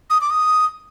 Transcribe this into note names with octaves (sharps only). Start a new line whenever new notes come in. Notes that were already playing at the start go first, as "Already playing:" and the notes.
D#6
D6
D#6